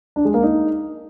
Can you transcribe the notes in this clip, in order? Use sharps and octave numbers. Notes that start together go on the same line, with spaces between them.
D4
G#3
A#3
D#4